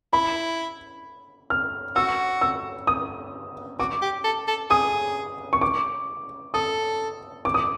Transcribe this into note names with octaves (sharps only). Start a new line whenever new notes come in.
E4 B5
F6
F#4 E6
E6
D#6
F#4 D6
G4
A4
A4
G#4 D#6
C#6
D6
A4 D#6
D6
D#6